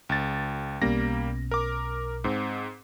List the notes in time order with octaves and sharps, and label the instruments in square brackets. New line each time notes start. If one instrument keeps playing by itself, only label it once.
[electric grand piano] C#2 A6
[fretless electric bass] B1 B3 C#4 [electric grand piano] G3 A#3 A#6
[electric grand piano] A#4 D6
G#2 C4